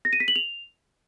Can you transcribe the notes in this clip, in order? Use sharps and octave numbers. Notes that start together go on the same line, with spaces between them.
A#6
D#7
B6
F#7
F7